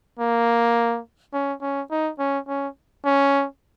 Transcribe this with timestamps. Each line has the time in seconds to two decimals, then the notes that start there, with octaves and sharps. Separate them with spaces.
0.19 A#3
1.33 C#4
1.61 C#4
1.91 D#4
2.19 C#4
2.48 C#4
3.05 C#4